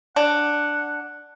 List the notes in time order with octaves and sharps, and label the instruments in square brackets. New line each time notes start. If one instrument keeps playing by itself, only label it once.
[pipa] D4 [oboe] F#5